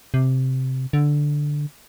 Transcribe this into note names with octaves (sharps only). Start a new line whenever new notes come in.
C3
D3